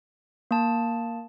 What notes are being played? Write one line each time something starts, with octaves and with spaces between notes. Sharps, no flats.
A#3 A5